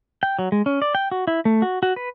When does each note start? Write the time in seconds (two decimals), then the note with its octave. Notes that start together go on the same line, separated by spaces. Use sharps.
0.23 G5
0.39 F#3
0.52 G#3
0.66 C#4
0.82 D5
0.95 G5
1.12 F#4
1.27 E4
1.45 A3
1.62 F#4
1.83 F#4
1.96 B4